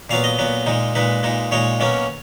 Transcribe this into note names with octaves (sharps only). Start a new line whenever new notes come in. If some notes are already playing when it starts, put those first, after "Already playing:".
A#2 F#3 B3 F5
D#5
A#2 F#3 B3
A#2 G#3 D#4
A#2 G#3 D#4 B4
A#2 G#3 D#4
A#2 G#3 D#4 C#5
B2 F#3 A#3 C#4